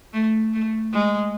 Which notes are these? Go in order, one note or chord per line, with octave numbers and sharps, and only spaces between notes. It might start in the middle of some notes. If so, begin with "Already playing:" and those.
A3
A3
G#3